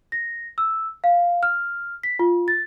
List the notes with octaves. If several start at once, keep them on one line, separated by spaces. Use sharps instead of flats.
A#6
E6
F5
F6
B6
F4
A6